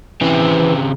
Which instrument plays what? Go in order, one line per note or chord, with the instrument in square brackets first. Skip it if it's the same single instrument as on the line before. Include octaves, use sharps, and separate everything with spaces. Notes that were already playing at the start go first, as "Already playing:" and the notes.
[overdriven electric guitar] C#3 C4 [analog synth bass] E3